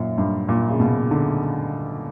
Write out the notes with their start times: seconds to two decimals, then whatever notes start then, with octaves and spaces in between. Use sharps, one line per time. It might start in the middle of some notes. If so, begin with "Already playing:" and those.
Already playing: F#2 A#2
0.18 G2
0.49 A#2
0.70 C#3
0.80 B2
1.11 D3